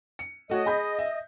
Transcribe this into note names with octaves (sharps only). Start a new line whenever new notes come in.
C#7
A3 F#4 C#5 D#5
G#4 B5 G6
E5